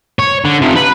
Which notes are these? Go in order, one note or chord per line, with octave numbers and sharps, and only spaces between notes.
C#5
D3
C3 F3
B4